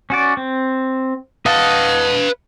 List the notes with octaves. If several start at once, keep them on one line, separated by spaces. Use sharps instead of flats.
C#4 F#4 D5
C4
B4 D#5 F5 F#5 A5